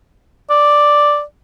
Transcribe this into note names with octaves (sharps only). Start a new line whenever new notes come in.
D5